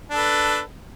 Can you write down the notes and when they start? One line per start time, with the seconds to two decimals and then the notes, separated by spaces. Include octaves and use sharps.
0.10 D4
0.13 A4
0.17 B4